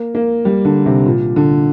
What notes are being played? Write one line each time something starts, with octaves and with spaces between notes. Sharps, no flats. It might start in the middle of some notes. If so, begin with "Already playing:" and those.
Already playing: A#3
A#3
G3
D3
C3
A#2
D3